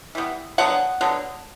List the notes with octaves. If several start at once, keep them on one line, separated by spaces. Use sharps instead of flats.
E3 G3 B3
D3 F#3 B3 F#5
D3 F#3 B3